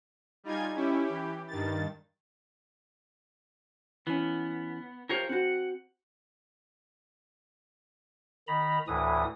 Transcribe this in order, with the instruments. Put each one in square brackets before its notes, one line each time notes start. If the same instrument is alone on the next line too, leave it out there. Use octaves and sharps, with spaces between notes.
[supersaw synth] G3 D#4 F4 G#5 G#6
C#4 E4 G4
E3 G4
G2 D#3 A6
[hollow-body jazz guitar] E3 C#4 [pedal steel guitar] B3
[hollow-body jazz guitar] F4 G4 C5 [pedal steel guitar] A#4 C#5 F5
[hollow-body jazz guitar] C4 F#4 [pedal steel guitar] F#5
[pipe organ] D#3 A#5 B5
D2 A2 E3 D#6